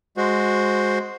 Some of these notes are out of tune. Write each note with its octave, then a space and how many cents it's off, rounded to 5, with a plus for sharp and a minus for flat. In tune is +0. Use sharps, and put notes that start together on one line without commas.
G#3 +0 F#4 -10 C5 +0